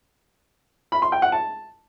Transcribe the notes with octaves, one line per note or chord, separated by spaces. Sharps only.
B5
C6
G5
F#5
A5